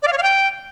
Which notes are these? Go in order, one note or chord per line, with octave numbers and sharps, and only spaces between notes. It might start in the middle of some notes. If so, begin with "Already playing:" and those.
D5
F5
C#5
F5
G5